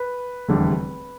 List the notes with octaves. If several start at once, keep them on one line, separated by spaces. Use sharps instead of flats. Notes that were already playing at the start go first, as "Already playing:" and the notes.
Already playing: B4
F1 E2 D3 G3